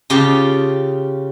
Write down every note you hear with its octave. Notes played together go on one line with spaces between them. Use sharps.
C#3 F4 G4 A5